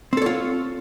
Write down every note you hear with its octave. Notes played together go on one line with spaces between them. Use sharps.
C4 F4 A4 C#5